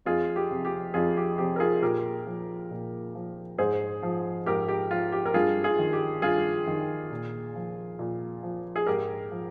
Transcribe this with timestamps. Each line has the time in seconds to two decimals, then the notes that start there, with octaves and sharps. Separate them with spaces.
0.06 F2 F4 G#4
0.36 G4
0.50 C3 F3
0.65 G4
0.94 F2 F4 G#4
1.17 G4
1.38 C3 F3 G4
1.56 A#4
1.60 F4 G#4
1.82 A#2 G4 A#4
2.26 F3
2.71 A#2
3.15 F3
3.58 G#2 G#4 C5
4.03 F3
4.46 G#2 G4 A#4
4.69 G4
4.91 F3 F4
5.12 G4
5.26 A#4
5.34 G2 F4 G#4
5.64 F4 G#4
5.79 D#3
5.93 G4
6.22 G2 F4 G#4
6.67 D#3
7.11 A#2
7.55 F3
7.99 A#2
8.43 F3
8.76 G#4
8.87 G#2 G4 A#4
9.31 F3